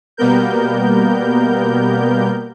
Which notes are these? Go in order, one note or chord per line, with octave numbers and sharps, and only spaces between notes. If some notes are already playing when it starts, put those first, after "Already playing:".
B2 G3 A#3 B3 A#4 G6